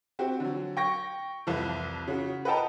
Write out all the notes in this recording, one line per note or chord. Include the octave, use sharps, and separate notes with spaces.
C4 F#4 G4
D3 F#3
G5 C#6 A#6
C2 F2 E3
C#3 F#4
B4 D#5 F#5 G5 A5 A#5